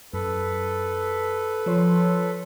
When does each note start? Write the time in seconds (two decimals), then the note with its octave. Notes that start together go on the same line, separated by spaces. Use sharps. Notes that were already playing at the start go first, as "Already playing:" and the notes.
0.14 F#2 A4 B4
1.66 F3 C#5 C6